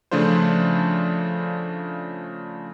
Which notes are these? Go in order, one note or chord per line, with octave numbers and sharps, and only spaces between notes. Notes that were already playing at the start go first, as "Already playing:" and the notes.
C#3 F3 A3 D4 F4 C5